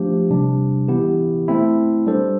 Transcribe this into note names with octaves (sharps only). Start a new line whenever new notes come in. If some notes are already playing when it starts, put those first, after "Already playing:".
Already playing: F3 A3 D4 G4
C3 G3 D4
E3 B3 E4 G4
A3 C4 E4
G3 D4 A4 C5